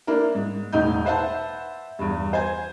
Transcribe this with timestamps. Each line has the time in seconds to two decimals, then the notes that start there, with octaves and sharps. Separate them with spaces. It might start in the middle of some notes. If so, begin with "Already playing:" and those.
0.07 A#3 D4 E4 A#4
0.35 G#2
0.73 E1 A2 D#4 G6
1.05 B4 C5 E5 F#5 A5
1.99 E2 G2
2.33 C5 G#5 G#6